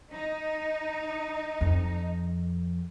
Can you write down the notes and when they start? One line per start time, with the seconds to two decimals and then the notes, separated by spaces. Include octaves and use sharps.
0.12 D#4
1.61 F2